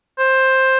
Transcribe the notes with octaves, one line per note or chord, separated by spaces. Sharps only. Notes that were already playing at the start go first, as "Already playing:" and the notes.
C5